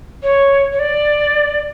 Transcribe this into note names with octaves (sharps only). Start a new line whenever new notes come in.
C#5
C#5
D5